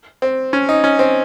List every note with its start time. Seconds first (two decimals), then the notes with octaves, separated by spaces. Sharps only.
0.22 C4
0.53 C#4
0.69 D#4
0.84 C#4
0.99 C4